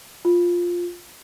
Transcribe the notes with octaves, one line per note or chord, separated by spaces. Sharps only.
F4